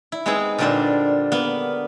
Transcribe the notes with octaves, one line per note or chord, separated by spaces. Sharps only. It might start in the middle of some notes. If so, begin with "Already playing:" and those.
E4
G#3 B3 C4 D#4 G#4
A#2 D3 G3 C4 D4 C5
A#3 B3